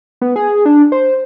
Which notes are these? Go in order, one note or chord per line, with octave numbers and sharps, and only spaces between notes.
B3
G#4
D4
C5